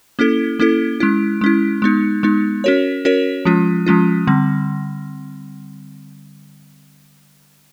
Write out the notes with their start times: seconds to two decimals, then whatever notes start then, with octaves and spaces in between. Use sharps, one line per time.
0.19 A#3 C#4 E4 A4
0.59 A#3 C#4 E4 A4
1.00 G#3 C#4 E4
1.41 G#3 C#4 E4
1.82 G#3 B3 D#4
2.23 G#3 B3 D#4
2.64 C#4 F#4 A#4 C#5
3.05 C#4 F#4 A#4 C#5
3.45 F3 G#3 C#4 F4
3.86 F3 G#3 C#4 F4
4.27 D3 G3 C4